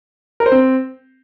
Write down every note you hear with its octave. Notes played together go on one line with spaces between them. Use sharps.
A#4
C5
C4